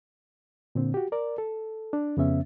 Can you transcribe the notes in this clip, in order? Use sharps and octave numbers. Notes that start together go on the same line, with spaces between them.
A#2 D3 C4
F#4 G4
A#4 D5
A4
D4
F2 C#3 B3 C#4 E5